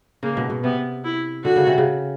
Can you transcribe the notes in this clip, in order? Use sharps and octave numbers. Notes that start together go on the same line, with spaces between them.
C#3 A#3
B2
B2
C3 B3
E4
D3 F#4
C#3
C3
C#3